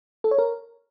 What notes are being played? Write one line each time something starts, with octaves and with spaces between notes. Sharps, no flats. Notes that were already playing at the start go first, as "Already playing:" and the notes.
A4
C#5
A#4